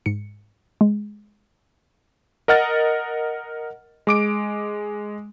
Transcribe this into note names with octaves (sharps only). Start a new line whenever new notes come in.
G#2 C#7
G#3
A#4 D#5 F#5 F6 A6
G#3 D6 D7